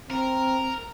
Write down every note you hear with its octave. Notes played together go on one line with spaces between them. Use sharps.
C4 A#4